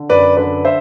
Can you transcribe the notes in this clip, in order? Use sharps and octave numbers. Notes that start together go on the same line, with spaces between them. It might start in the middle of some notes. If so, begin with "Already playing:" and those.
Already playing: D3
F#2 B4 D5
D3 B4 D5
C5 E5